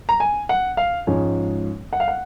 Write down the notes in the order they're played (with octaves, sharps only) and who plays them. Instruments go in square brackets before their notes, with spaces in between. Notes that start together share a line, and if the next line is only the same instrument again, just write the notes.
[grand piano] A#5
G#5
F#5
F5
G#2 F3 G#3 C#4
F#5
F5
F#5